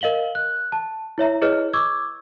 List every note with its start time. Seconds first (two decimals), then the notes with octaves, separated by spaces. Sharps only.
0.01 A#4 D#5 F5 F#7 G7
0.35 F#6
0.72 A5
1.18 E4 C#5 E5 A#5
1.41 E4 G#4 B4 C#5 D#5 F6
1.73 C#6 D6 E6 G#6